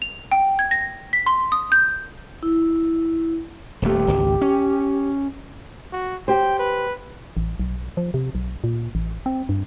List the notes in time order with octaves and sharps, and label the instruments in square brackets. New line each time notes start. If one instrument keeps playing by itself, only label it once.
[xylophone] F7
G5
G#6
A#6
B6
C6
D#6
G6
[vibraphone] E4
[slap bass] D#1 F2 A3 [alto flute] G4
[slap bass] D1 G#1 C#2
C#4
[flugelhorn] F#4
[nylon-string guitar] G4 C5 [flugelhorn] G5
[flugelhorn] B4
[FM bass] A1
B1
F3
C3
B1
A#2
A1
C4
G2